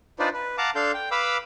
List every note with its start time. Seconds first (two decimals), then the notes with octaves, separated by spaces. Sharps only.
0.19 D4 D#4 F4 B4 C5 D5
0.33 B4
0.58 F5 F#5 A5 A#5 D6
0.75 D4 A4 F5 C6 G6
0.94 G5
1.11 B4 F5 B5 D6 E6